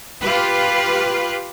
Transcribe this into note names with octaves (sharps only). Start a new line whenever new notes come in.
F4 G4 B4